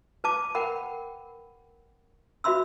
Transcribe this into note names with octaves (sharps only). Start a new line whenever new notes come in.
B4 A5 D6
A#4 F#5 G5 B5
F#4 B4 E5 B5 C6 E6